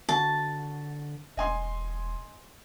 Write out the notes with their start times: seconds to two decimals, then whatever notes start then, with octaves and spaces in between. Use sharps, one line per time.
0.09 D3 F#4 A5
1.37 E1 D#5 G#5 C6